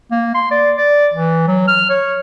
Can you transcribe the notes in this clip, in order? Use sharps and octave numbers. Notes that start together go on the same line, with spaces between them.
A#3
C6
D5
D5
E3
F#3
F6
C#5